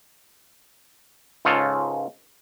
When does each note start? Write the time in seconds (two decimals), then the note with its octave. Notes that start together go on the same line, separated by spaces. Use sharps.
1.45 C#2 G#2 C#3 F4 A4